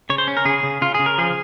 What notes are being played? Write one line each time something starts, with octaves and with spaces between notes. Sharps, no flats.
C#3 C#5
C5
C#4
A#4
C#3 G#4
C#3
C#3 F4
C#3 G#4
A#4
F3 G#4